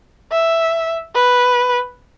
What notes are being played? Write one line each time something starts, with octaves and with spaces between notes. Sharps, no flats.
E5
B4